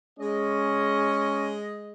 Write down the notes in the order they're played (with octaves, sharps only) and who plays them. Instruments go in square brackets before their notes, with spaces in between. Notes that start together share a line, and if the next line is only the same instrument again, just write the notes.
[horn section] G#3 D#5 [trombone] C#4